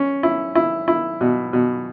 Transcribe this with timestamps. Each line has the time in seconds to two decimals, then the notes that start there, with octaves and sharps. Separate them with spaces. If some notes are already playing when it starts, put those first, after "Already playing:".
Already playing: C#4
0.23 E4
0.55 E4
0.88 E4
1.21 B2
1.53 B2